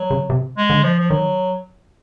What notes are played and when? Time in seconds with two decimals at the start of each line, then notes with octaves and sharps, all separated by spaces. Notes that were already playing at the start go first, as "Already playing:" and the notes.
Already playing: F#3
0.10 C#3
0.30 C3
0.57 G#3
0.70 D3
0.83 F3
1.00 F3
1.10 D#3 F#3